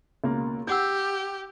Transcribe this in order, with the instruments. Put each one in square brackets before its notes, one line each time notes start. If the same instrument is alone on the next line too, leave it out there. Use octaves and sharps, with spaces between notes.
[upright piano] C#2 B2 A#3
[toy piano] D#4 F#5 E6 [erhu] G4 [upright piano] G6